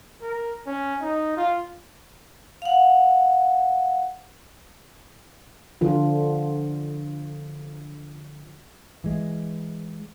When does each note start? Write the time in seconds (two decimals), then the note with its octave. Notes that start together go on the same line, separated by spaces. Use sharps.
0.22 A#4
0.67 C#4
1.01 D#4
1.37 F4
2.62 F5 F#5
5.81 D3 F3 F4
9.04 E3 G#3